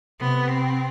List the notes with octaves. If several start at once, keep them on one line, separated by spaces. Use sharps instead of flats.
C3 B3
C4